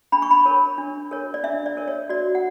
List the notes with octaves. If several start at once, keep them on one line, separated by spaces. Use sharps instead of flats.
D4 B5
C#6
B5
A#4 C#5
D4
A#4 C#5
D5
D4 E5
D5
A#4 C#5
C#5
F#4 D5
F#5